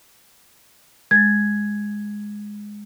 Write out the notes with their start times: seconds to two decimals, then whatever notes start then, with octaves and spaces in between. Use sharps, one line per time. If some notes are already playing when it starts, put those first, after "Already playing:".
1.11 G#3 G#6 A6